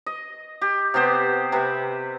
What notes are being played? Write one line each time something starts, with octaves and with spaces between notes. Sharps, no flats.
D#5
G4
C3 B3 G4 C5
C3 B4 E5